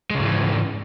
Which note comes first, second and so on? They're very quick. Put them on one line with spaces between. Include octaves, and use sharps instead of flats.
G#3 C#3 G#2 E3